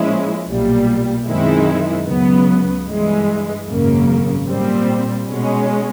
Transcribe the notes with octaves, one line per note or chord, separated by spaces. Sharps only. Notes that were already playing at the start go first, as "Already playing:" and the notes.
Already playing: A#2 F3 G#3 C#4 E4
B1 A#2 G3
F#2 D#3 G#3 C4 E4
C#2 C#3 F#3 B3
G2 E3 G#3
G#1 F#2 C#3 F#3 A#3
A#2 G3 C4
B2 G#3 C#4